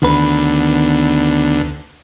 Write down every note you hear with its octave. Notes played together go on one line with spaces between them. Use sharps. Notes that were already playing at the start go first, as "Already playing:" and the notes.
D2 D#3 B3 B4